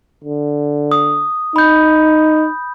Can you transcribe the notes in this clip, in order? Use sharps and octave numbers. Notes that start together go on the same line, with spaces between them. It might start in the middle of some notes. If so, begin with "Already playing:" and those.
D3
D#6
D#4 B5 G6